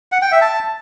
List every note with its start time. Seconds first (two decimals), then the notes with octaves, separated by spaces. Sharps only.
0.12 F#5
0.22 G5
0.32 E5
0.42 A5